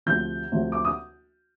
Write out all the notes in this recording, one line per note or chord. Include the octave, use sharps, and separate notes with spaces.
D2 C3 F3 G6
D2 C3 F3
D6
D#6